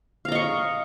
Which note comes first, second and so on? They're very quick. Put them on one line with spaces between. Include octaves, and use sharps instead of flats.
F5 A#5 D#5 C#6